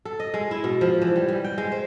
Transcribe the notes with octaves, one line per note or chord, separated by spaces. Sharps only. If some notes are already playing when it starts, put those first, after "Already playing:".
A4
D#5
G#3
E4
B2
F3
E3
G3
G3
G5
G#3
C5